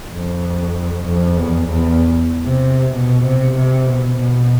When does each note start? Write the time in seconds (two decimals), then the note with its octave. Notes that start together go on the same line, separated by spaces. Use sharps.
0.12 F2
1.06 F2
1.37 E2
1.68 E2
2.46 C3
2.93 B2
3.24 C3
3.55 C3
3.87 B2
4.19 B2